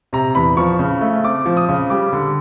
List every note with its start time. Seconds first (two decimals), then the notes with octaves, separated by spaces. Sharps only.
0.13 C3 A#5
0.35 E2 B5
0.57 F3 C#6
0.79 C#3
1.01 A3
1.24 C4 D6
1.45 F3
1.57 D#6
1.69 C#3
1.90 G3 D6
2.13 D3